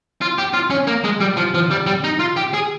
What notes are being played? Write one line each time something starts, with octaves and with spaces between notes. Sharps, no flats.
F4
G4
F4
C#4
A#3
G#3
G3
F3
F3
G3
G3
D#4
F4
G4
G#4